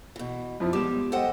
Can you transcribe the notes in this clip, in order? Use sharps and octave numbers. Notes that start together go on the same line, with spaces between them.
B2 E3
F2 F3 E4
G3 G#3 B3 G4 D6 E7
A4 C5 D#5 F#5 G5